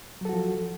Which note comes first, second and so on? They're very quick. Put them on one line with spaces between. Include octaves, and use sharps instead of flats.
F#3 A4 F#4 F3